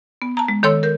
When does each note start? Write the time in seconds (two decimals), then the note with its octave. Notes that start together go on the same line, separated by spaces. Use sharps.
0.22 B3
0.37 A5 A#5
0.48 G#3
0.63 D#3 A4 C#5 C6 E6
0.83 A#4 G6